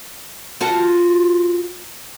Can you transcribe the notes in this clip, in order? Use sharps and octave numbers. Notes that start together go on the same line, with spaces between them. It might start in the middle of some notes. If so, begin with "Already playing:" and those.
F4 F#4 A4